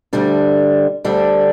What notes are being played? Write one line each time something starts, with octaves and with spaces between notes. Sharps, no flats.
D2 D3 G3 D4
D2 D3 G3 D4